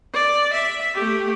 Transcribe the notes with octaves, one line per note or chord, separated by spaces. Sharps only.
D5
E5
A3 G4